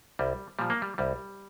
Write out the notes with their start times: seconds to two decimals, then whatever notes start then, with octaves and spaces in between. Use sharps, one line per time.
0.19 C2 G3
0.59 A#2 F3 G3
0.70 A#3
0.82 G3
0.98 C2 G3